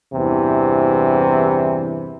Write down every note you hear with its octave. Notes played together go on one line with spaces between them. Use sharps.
E2 G2 C3 E3